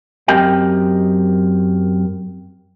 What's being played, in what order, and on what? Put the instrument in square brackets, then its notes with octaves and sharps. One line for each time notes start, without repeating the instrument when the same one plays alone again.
[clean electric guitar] F#2 C4 G4 A#4 D#5 G5